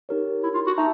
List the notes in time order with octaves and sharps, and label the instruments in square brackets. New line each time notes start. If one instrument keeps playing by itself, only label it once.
[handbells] D#4 G4 A#4 C#5
[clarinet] E4
F4
F#4
[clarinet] D#4 [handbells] E5 A5